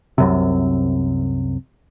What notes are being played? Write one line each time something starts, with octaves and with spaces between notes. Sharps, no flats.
C2 F#2 C3